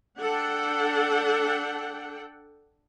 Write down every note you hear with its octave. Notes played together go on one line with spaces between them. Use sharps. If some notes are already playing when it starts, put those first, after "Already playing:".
D4 A4 F#5 G5